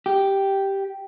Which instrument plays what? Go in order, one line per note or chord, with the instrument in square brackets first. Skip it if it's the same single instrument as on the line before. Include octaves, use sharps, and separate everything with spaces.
[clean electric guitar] G4